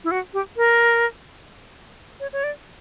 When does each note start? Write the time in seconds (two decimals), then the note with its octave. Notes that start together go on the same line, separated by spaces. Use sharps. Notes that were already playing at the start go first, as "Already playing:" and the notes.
0.04 E4
0.11 F#4
0.34 G4
0.57 A#4
2.20 C#5
2.33 C#5
2.44 D5